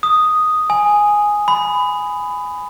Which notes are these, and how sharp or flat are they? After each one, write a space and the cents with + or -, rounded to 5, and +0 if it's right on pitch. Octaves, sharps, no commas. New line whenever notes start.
D#6 +0
G#5 +0
B5 +20